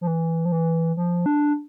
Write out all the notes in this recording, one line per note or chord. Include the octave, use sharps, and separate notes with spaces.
F3
E3
F3
E3
F3
D4